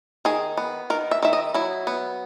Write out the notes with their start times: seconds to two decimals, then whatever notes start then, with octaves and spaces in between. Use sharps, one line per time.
0.25 D#3 G#4
0.57 B3
0.90 D#3 A#4
1.11 E5
1.23 D#3 E5
1.33 D#5
1.54 F#3 E4
1.87 B3